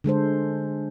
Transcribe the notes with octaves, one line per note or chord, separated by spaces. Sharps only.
D3 G#3 A4 C5